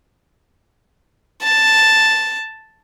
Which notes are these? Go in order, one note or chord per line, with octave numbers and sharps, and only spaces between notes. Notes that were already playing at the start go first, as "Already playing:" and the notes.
A5